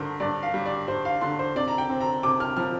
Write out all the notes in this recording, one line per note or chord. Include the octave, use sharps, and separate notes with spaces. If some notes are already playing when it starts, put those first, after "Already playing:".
Already playing: G2 D3 A#4 C5
G2 D5
F5
G3
D5
G2 C5
F5
D3 C6
C5
C3 D5
A#5
G5
C4
A#5
C3 D6
F6
F3 F6